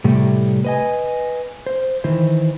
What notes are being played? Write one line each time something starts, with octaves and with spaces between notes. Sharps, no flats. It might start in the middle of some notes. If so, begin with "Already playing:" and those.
A2 C3 G3 A3
B4 D#5 G#5
C5
D#3 E3 C5